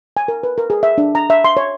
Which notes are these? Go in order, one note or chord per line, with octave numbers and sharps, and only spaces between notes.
G#5
A#4
B4
A#4
G#4
E5
D4
A#5
E5
C6
C#5